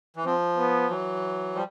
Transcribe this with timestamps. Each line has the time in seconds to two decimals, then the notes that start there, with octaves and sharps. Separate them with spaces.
0.16 E3
0.25 F3 C4
0.58 B3
0.90 E3 F#3
1.55 F3 G3